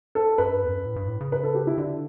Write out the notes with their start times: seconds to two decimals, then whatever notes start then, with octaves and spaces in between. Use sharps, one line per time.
0.15 A4
0.38 F#2 B4
0.54 G2
0.64 E2
0.70 F#2
0.85 A2
0.96 G2
1.08 A2
1.21 C#3
1.32 B4
1.44 A4
1.55 G4
1.67 E4
1.78 D3 D4